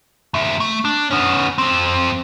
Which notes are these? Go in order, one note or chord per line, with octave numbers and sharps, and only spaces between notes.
D#2 E5
A3
D4
B3 C#4
F2 C4